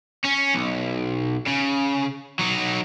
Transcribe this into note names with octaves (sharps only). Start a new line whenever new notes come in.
C#4
B1
C#3
F#3 D#4